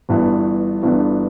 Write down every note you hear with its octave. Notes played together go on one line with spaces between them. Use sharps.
G1 G2 E3 B3
G1 G2 E3 B3